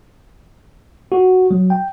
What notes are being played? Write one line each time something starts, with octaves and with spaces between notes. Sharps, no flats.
F#4
F#3
G5